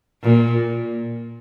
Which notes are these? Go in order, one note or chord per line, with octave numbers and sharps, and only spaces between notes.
A#2